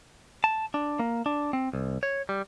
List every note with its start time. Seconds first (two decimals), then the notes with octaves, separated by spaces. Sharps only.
0.44 A5
0.74 D4
1.00 A#3
1.26 D4
1.53 C4
1.73 C2
2.03 C#5
2.29 G3